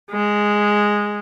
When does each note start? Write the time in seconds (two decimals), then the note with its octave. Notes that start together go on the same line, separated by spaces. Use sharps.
0.11 G#3